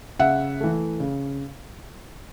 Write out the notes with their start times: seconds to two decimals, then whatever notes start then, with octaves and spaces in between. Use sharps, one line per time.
0.19 C#3 E5 F#5
0.60 E3 A3
1.00 C#3